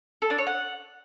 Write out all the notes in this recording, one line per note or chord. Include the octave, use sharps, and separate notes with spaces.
A4
D4
C#5
F#5